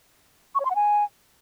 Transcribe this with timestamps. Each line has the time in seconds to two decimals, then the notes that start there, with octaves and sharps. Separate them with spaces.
0.55 C#6
0.60 C#5
0.65 C6
0.70 F#5
0.76 G#5